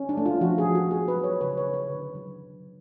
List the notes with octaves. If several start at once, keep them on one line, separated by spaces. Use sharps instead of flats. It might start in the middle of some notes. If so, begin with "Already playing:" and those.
Already playing: C#4
D4
A3
F4
F3 F#4
G#4
F3
F#4
B3 G#4
B4
F#3
C#5
C#3 B4
C#5
B3
B4
D3
F#3